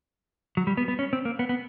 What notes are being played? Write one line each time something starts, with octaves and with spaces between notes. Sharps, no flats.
F#3
G3
B3
B3
C#4
C4
A#3
B3
B3